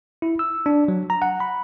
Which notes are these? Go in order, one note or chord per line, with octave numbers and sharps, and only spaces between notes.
E4
E6
D4
F#3
A#5
F#5
B5